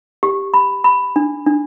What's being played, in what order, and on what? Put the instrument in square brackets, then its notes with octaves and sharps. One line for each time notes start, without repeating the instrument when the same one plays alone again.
[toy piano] G4
B5
B5
D4
D4